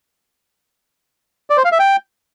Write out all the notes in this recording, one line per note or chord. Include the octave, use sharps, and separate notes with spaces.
D5
C5
F5
E5
G5